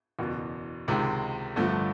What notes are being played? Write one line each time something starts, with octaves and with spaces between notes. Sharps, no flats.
F#1 E2 B2
C#2 C3 D#3 G#3
G1 G2 D3 F3 A3